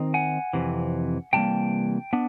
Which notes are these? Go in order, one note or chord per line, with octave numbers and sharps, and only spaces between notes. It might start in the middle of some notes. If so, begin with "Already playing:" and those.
Already playing: D#3 C4 D#4
F#5 G#5
F2 C3 E3
C3 E3 G3 A#3 G5 A5
B3 D4